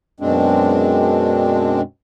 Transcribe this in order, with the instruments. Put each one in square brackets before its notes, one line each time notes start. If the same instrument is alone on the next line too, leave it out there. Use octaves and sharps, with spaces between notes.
[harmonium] F#2 B2 G#3 C4 D4